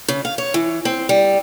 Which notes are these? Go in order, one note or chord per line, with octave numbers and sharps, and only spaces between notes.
C#3
F5
C#5
E3
C4
G3